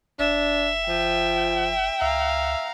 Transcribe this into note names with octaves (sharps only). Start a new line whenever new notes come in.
F#1 D4 E5
F3 G5
C#2 E5 F5 A#5